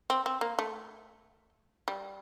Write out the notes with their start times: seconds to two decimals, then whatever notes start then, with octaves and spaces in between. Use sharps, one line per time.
0.10 C4
0.26 C4
0.41 A#3
0.59 A3
1.88 G3